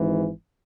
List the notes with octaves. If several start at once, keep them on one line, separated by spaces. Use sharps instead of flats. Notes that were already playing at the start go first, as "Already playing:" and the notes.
Already playing: G#1 G#2 E3